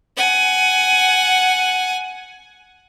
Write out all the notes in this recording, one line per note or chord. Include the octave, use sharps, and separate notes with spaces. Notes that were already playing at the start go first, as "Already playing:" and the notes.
F#5 G#5